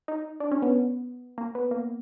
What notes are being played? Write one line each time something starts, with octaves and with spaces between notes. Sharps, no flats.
D#4
D4
C#4
B3
A#3
B3
A#3